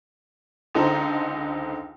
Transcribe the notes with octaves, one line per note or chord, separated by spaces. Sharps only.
C#2 D3 D#4 A4 C5 A#5